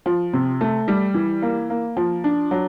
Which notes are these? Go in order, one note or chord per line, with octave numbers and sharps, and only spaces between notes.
F3
C3
A3
G3
E3
A#3
A#3
F3
D4
F#3